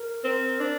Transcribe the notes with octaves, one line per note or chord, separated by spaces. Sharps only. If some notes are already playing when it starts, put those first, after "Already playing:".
Already playing: A#4
C4
D4